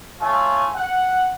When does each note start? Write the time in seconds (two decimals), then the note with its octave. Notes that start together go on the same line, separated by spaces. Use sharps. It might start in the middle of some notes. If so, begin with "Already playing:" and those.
0.20 A3 F4 C#5 G#5
0.75 F#5